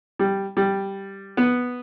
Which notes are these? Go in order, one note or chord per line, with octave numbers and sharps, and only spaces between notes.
G3
G3
B3